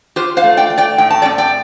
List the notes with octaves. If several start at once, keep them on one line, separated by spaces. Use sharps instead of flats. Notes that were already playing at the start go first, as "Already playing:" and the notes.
F4 G4 C5
C5 F5
A3
D5 G5
A3
D5 G5
A2 G5
A5
D5 G5
C4
D5 G5